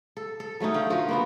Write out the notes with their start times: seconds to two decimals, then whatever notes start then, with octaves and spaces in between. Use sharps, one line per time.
0.17 A4
0.40 A4
0.60 F#3 A3 C#4 D#4
0.74 D3 F5 G5
0.90 F3 F#4 A#4
1.09 A#3 B3 F#4